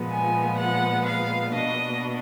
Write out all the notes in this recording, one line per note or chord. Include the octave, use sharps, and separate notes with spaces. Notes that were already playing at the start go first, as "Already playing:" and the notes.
Already playing: A#2 F3 G#3 B3
G#5
F#5
F5
B2 A#3 D4 D#5